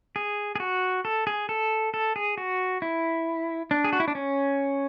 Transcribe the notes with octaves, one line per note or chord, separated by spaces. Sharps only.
G#4
G#4
F#4
A4
G#4
A4
A4
G#4
F#4
E4
D4
G#4
F#4
E4
D4
C#4